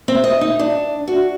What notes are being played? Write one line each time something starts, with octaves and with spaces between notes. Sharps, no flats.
C4
D#5
D#4
D4
F#4